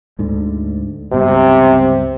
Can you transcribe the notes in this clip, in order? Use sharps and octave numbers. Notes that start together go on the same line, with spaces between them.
D2 G#2 D3
C#2 G2 C3 B3